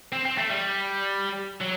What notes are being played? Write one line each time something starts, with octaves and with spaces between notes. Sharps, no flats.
C4
C4
A3
G3
F#3